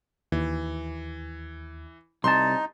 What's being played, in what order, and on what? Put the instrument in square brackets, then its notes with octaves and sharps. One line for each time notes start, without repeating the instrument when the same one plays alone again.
[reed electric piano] D#2 [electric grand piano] E3
[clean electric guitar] C2 A5 [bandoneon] D#4 [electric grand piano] C6